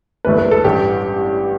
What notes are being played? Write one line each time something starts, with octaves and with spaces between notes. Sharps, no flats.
G1 G2 E3 A3 B4
B4
A4
A1 G2 E3 G4